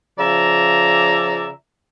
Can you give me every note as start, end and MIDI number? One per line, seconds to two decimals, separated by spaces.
0.18 1.49 49
0.18 1.49 53
0.18 1.49 74
0.18 1.49 76
0.18 1.49 82